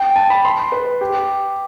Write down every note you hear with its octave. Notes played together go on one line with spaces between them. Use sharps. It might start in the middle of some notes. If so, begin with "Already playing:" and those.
Already playing: G5
A5
B5
C6
B4
G4